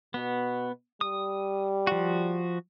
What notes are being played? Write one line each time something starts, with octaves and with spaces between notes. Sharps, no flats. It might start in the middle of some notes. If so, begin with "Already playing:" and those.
B2 B3
G3 D#6
F3 F#4